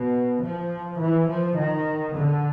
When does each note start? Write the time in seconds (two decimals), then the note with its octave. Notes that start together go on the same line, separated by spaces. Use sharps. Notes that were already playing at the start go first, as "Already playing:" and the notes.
Already playing: B2
0.42 F3
0.99 E3
1.27 F3
1.56 D#3
2.13 D3